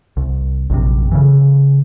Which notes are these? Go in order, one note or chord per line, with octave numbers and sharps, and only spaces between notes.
C2
A#1 F#2 C3
C#3 E3